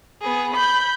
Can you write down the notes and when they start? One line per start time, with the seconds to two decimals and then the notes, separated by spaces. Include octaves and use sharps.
0.22 B3 G#4
0.54 B5 G6